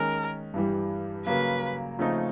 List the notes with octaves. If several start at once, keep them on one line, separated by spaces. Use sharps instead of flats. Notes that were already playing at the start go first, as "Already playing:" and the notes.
Already playing: D#3 G#3 C#4 A#4
G2 E3 G3
C#3 F#3 A#3 B4
C#3 F3 A3 C4 D#4